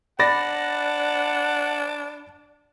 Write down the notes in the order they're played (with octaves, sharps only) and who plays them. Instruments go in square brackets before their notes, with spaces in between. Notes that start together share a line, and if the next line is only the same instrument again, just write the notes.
[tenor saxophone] D4 [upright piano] D5 [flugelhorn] F#5 [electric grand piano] B5 A6 A#6